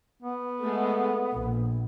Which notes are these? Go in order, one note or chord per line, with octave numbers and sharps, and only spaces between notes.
B3
G#3 A3
A#1